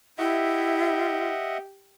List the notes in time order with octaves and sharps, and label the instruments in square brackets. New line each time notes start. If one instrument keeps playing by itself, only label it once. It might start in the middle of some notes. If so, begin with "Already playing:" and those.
[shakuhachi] E4 [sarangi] G4 [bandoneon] D#5 E5 F#5